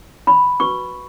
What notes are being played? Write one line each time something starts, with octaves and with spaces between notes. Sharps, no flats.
B5
F#4 B4 C#6